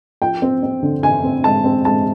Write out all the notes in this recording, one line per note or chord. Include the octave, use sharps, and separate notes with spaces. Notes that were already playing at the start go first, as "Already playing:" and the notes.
F3 G5
C4
C4
D3
D3 G#5
C4
G#3 A5
C4
G#3 A5